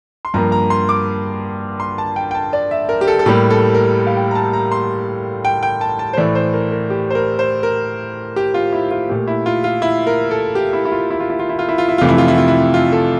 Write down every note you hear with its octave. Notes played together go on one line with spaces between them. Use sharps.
C6
G2 F3 A#3 A#5
A#5
C6
D6
C6
A5
G5
G5
A5
D5
E5
A#4
G4
A4
A4
A2 G3 A#3 G4
A4
A#4
F5
G5
A#5
A5
A#5
C6
G5
G5
A5
A5
C5
A2 E3 A3 D5
C5
A#4
A#4
G4
C5
A#4
C5
A#4
G4
F4
E4
F4
A#2 A3 G4
E4
F4
F4
E4
A#4
A4
G4
E4
E4
F4
E4
F4
E4
F4
E4
F4
E4
F4
E4
F2 C3 E3 A3 F4
E4
F4
E4
F4
E4
F4
A4